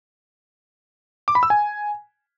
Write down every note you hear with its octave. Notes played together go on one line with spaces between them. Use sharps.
D6
B5
E6
G#5